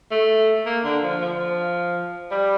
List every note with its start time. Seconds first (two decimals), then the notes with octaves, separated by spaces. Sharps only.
0.11 A3
0.66 A#3
0.84 D3
1.03 F3
1.21 F3
2.31 G3